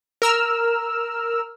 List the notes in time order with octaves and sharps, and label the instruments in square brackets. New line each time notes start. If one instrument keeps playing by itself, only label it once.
[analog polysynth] A#4 E6 F6